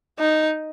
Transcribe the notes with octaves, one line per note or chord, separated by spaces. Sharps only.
D#4